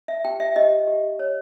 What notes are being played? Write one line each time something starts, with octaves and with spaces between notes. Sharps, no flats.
E5
G4 G5
E5
G4 D#5
G4
C#5